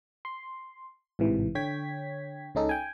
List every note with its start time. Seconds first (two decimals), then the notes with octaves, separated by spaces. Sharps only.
0.25 C6
1.19 A1 G#2 C3 E3
1.55 D3 C#5 G5 G#6 B6
2.55 C#2 C#3 C#4 D#4 A4
2.69 G5 G#5